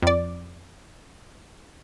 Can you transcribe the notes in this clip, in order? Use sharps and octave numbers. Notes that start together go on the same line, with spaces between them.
F2 D5